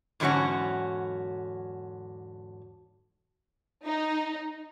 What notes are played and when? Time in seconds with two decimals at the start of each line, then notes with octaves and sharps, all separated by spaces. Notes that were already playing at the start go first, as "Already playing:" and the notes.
0.20 E2 G#2 D3 F#3 C#4 F#4
3.85 D#4